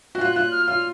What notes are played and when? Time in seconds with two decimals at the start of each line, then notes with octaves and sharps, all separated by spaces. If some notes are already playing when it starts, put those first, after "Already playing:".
0.15 F#4
0.21 F4 F#6
0.36 F4 F#6
0.51 F6
0.67 F4 F6